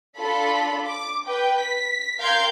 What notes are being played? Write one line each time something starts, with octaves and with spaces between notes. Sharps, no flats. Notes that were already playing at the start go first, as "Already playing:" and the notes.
D4 F4 A4 B5
D6
B4 G5
B6
A#4 F5 G5 C6 G6 G#6